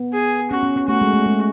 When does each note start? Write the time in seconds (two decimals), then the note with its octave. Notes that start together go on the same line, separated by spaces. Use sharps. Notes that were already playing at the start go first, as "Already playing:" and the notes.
Already playing: B3
0.13 G#4
0.51 C#4 F#4
0.63 C#4
0.76 C#4
0.88 A3 F#4
1.01 G#3
1.14 A3
1.26 G#3